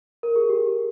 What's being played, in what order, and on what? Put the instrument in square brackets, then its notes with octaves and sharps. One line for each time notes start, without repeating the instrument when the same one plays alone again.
[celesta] A#4
G#4
G4